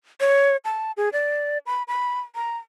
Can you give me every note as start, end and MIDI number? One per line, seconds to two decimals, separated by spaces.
0.21 0.57 73
0.65 0.92 81
0.97 1.09 68
1.13 1.58 74
1.66 1.83 83
1.88 2.20 83
2.35 2.57 82